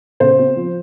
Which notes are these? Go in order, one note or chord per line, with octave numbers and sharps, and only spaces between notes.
C#3 C5
C4
F3